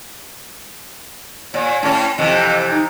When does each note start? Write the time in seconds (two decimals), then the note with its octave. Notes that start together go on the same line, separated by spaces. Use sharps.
1.54 A#2 C#5
1.83 A2 C#4 A5
2.18 F2 C3 E3 D#5
2.71 D#4